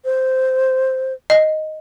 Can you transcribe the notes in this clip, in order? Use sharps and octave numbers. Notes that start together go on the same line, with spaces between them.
C5
D#5